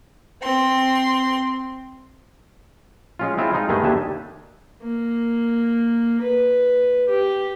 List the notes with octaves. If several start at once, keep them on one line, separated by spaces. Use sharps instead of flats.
C4 C6
G#3 C#4 F4
G#3 C4 E4 F4
G#3 D#4 F4
G2 D#3 A3 B3 G#4 D#5
D#2 D4 G4 E5 G#5
A#3
B4
G4